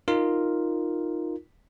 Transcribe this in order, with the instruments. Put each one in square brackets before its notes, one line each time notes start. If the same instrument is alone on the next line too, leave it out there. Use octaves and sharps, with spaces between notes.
[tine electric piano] D#4 F4 A#4